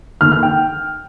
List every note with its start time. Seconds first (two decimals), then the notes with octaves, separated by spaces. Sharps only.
0.21 D#3 A#3 F6
0.32 F6
0.43 G5